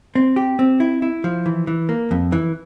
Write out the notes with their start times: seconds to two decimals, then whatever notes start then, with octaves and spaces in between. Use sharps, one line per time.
0.15 C4
0.36 G4
0.59 C4
0.80 E4
1.02 E4
1.24 F3
1.46 E3
1.67 E3
1.89 A#3
2.11 F2
2.32 E3